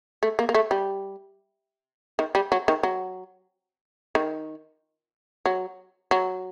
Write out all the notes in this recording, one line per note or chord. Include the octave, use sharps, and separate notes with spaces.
A3
A#3
A#3
A3
G3
D#3
G3
F#3
D#3
F#3
D#3
F#3
F#3